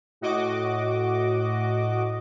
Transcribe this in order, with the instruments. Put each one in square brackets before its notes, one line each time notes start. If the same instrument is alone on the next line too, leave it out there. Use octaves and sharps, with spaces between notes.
[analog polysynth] A2 F#4 D#5 D6